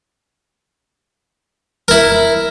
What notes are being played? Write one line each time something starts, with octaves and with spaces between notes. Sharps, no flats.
E4 A#4